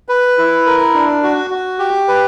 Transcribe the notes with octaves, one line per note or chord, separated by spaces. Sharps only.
B4
E4
A#4
D4
F#4
F#4
G4
B4